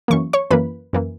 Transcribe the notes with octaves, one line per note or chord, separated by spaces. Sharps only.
F#2 E3 A#3 C#6
C#5 C#6
F#2 E3 A#3 B4 B5
F#2 E3 A#3